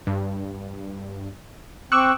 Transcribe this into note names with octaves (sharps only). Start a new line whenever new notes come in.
G2
C4 C#6 D6 E6 F#6